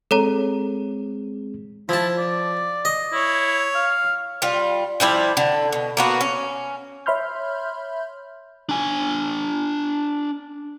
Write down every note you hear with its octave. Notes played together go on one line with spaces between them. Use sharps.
G#3 C4 G#4 A4 C#5 A#5
F3 E4 A5
D5
D#5
E4 C#5
F5
G3 F4
F3 G3 E4 D5
D3
B2
A#3 B3 F#4
C#4
C#5 E5 B5 C6 F6 G6
D4 G#5